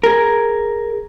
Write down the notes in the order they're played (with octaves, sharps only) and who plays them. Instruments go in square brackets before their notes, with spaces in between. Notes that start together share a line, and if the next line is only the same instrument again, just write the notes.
[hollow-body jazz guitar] G#4 A#4